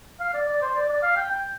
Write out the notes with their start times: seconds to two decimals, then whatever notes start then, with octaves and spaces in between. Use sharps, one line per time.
0.20 F5
0.34 D5
0.48 D5
0.62 C5
0.75 D5
0.89 D5
1.03 F5
1.17 G5
1.30 G5